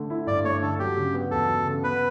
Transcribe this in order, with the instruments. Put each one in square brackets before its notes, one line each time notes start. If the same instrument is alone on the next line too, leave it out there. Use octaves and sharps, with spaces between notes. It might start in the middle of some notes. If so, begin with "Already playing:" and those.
Already playing: [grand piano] D3 A3
E4
[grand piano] G2 [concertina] D5
[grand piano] A3 [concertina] C#5
[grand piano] D3 [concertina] A4
[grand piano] F#3 [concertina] G4
[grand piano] C#3
B3
[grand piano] E2 [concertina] A4
[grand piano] F#3
C#3
[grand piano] B3 [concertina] B4